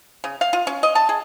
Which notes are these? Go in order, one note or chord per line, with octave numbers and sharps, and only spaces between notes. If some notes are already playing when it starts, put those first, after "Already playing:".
C#3
F5
F4
C#4
D#5
A5
G#4